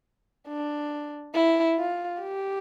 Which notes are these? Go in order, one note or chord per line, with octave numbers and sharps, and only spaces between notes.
D4
E4
F4
G4